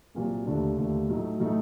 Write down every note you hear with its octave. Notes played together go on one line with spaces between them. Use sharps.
C2 A#2 F#3
D#2 D3 A3 D4
D#2 D3 A3 D4
A2 F#3 A3 D#4
A2 F#3 A3 D#4